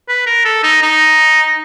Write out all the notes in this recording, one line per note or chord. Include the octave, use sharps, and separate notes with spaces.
B4
A#4
A4
D#4
D#4